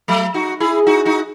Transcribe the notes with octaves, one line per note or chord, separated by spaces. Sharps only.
F#3 A3
D#4 F#4
E4 G#4
D#4 F#4
D#4 F#4